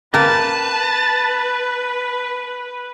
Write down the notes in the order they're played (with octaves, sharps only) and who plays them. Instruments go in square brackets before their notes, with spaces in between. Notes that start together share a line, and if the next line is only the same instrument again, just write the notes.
[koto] A#3 A#4 [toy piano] C#4 [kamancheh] B4 [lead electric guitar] A5